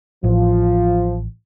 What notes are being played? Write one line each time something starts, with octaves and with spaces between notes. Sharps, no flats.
A1 F3